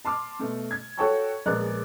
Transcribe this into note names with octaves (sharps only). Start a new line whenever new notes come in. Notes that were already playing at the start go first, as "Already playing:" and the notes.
A5 C6 D6 F6
B2 A3
G#6
F#4 A4 C#5 G5 A5 C#6
A#1 G#3 B3 A#4 D5 F#6